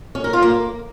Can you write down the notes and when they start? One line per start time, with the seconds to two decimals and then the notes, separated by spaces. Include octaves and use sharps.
0.15 C#4
0.24 A#4
0.33 F4
0.42 A#3